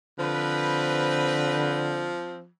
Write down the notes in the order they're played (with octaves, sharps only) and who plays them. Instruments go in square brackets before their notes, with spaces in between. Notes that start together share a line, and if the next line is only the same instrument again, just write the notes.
[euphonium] D3 [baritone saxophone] F3 [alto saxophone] C4 [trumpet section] B4